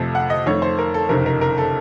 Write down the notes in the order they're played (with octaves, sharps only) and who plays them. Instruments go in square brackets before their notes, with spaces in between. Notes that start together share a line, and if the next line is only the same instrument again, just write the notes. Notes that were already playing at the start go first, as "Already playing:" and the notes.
Already playing: [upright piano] F2 C3 F3 A3
F#5
D#5
F2 D#3 A3 C#5
C5
A#4
A4
F#1 F2 C3 D#3 A#4
A#4
A#4
A4